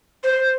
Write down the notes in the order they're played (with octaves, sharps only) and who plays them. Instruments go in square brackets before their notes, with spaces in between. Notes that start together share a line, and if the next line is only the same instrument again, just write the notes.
[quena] C5